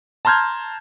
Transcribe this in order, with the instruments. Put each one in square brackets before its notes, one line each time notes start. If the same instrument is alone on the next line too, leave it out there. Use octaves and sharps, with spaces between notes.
[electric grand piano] A5 A#5 C6 F6 G6 G#6